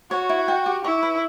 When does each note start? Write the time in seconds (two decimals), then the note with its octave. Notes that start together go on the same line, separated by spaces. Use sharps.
0.11 F#4 C#5
0.29 E4
0.48 G5
0.66 G4
0.84 E4 C#6
1.03 B4